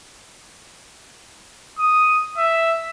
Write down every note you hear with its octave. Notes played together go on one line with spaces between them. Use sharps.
D#6
E5